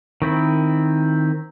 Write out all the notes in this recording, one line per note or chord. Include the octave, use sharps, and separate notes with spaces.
D#3 C4 E4